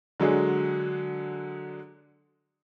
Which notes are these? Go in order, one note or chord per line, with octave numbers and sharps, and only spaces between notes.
D3 F#3 G#3 D4 G#4